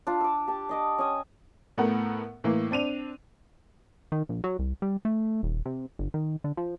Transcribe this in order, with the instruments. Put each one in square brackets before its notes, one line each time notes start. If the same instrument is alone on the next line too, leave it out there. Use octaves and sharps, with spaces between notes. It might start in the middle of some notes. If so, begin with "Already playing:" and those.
[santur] D4 F4
D6 E6
G4 A5
D4 D#5 D6
C#4 G#5 D#6
[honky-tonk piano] A2 A3 B3 A#4 F#5
A2 E3 A#3
C4 D4 D#7 F7
[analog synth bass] D#3
A#1
F#3
C2
G3
A3
D#1
C3
G1
D#3
D3
F3